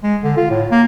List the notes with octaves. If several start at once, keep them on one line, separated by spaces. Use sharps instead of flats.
G#3
D3
F4
A2
A#3